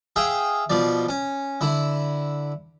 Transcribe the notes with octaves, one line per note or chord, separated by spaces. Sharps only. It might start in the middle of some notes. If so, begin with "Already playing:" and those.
G#4 E5 F5 G5
B2 F3 D5
C#4
D3 E4